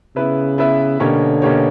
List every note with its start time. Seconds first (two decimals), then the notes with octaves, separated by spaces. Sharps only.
0.16 C#3 B3 E4 B4 E5
0.58 B3 E4 B4 E5
1.00 B2 D3 A#3 C#4 G4 C#5
1.42 B2 A#3 C#4 G4 C#5